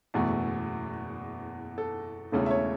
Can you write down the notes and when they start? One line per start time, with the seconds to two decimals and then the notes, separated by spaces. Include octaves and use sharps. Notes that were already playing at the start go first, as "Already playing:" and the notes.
0.14 F#1 E2 B2 A3
1.78 A4
2.32 E1 E2 C#3 A3 A4
2.46 E5
2.51 C#5